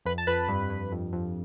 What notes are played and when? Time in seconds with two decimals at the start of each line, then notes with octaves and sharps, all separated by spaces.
0.05 F2 B4 B5
0.18 A5
0.27 F2 B4 B5
0.49 G2
0.70 G2
0.92 F2
1.13 F2